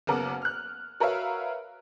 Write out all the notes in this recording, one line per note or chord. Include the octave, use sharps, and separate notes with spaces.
F#1 C#3 B3 A#4 F#5 D6
F6 F#6
F#4 A#4 B4 C#5 E5 F5